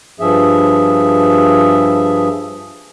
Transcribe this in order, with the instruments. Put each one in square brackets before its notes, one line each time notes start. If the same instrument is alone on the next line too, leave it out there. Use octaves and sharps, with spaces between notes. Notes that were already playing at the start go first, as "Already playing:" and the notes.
[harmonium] G2 F3 G#4 E5